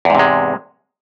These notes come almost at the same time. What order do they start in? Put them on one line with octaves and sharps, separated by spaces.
E2 G#2 C3 G#3